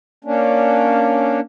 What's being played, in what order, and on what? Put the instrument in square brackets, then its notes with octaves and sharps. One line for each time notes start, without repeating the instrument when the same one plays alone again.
[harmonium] A#3 C#4 D4